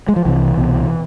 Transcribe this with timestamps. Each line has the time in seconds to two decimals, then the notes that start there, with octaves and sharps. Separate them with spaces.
0.08 G#3
0.16 F3
0.25 C2 C3 E3
0.57 C2 B2